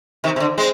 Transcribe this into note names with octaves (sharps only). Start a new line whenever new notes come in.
C3 D#3
C3
D3
G#3 C4